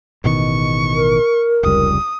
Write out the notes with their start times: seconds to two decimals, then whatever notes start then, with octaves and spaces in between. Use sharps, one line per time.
0.24 A1 B2 D#3 C#6
0.94 A#4
1.63 F1 C#2 G3 D#6